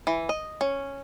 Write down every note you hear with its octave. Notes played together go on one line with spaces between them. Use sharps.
E3
D#5
C#4